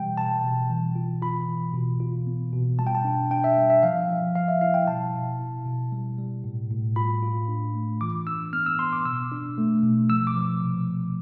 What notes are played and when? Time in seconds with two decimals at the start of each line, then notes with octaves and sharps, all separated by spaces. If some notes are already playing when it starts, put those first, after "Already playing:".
Already playing: B2 E3 G3 G5
0.18 B2 A5
0.44 B2
0.70 E3
0.95 F4
1.22 F4 B5
1.48 E3
1.74 B2
2.00 F4
2.27 B3
2.53 B2
2.79 G3 A5
2.87 G5
2.95 A5
3.04 D4
3.31 D4 G5
3.44 E5
3.57 G3
3.70 E5
3.83 F3 F5
4.09 F3
4.35 F3 F5
4.48 E5
4.61 E4 F5
4.74 G5
4.87 B2 A5
5.13 B2
5.39 E4
5.66 B2
5.92 G3
6.18 G3
6.44 A2
6.70 A2
6.96 F4 B5
7.22 F4
7.48 D4
7.74 A3
8.01 E3 D6
8.27 D4 E6
8.53 B3 F6
8.66 E6
8.79 B3 C6
8.93 D6
9.05 B2 E6
9.32 D4
9.58 A3
9.83 B2
10.10 F3 E6
10.27 D6
10.36 F3
10.62 C3
10.88 C3